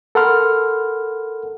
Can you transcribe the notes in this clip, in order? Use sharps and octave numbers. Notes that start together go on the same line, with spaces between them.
A4 A#4 F#5 B5 C6 F6